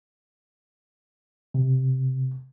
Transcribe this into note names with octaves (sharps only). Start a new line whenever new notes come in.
C3